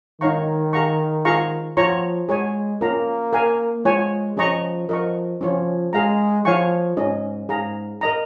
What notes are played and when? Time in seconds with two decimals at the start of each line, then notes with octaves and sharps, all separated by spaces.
0.21 D#3 D#4 C#5 F5 A#5 C#6
0.73 G#4 F5 A#5 C#6
1.25 F4 G#4 F5 A#5 C#6
1.76 F3 F4 C#5 A#5 C#6
2.29 G#3 G#4 C#5 G#5
2.81 A#3 C#4 F4 A#4 F5 A#5
3.33 A#4 F5 G#5
3.85 G#3 F4 C#5 G#5
4.37 F3 C#4 G#4 D#5 A#5 C#6
4.89 F3 A#4 D#5 C#6
5.41 F3 C#4 F4 C#5
5.93 G#3 G#4 F5 A#5
6.45 F3 F4 C#5 F5 G#5 C#6
6.97 G#2 C#4 G#4 D#5
7.49 G#2 G#4 F5 A#5
8.01 A#4 D#5 A#5